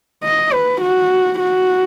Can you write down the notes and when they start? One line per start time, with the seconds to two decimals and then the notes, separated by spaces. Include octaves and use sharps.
0.24 D#5
0.53 B4
0.81 F#4
1.39 F#4